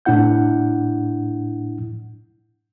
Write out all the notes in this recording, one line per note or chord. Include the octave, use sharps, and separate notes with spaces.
A2 D4 E4 F#5 G6